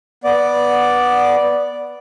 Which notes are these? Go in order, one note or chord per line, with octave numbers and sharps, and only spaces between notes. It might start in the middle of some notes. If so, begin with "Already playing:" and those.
B3 D5